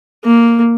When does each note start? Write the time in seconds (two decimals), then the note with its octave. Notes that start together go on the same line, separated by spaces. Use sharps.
0.25 A#3